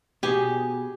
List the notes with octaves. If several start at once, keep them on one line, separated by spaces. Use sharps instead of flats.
B2 B3 G4 G#4 G#5